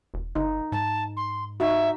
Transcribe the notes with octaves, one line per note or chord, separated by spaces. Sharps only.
E1
G1 D#4
G#2 A5
C6
D#4 F#4 E5